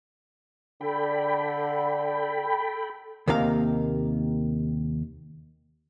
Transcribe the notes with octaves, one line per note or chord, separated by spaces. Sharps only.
D3 A4 G5 B5
D#2 C3 D#3 A#3 F5